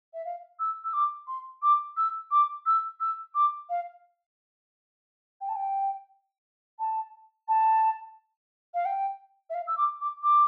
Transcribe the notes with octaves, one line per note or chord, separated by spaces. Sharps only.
E5
F5
E6
E6
D6
C6
D6
E6
D6
E6
E6
D6
F5
G5
A5
G5
A5
A5
F5
G5
E5
F5
E6
D6
D6
D6